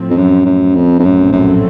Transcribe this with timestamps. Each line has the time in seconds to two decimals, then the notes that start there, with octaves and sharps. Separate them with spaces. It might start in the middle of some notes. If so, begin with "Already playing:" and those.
Already playing: A2 F3 C4
0.10 F2
0.17 F#2
0.45 F#2
0.75 F2
0.99 F2
1.04 A#1 F#2 A2 F#3 A3 C4
1.32 F#2